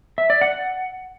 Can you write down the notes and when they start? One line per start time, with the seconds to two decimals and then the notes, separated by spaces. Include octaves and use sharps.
0.18 E5
0.30 D5
0.41 F#5